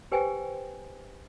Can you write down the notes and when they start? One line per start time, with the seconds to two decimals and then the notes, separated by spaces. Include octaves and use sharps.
0.12 G4 B4 C5 G5 G#5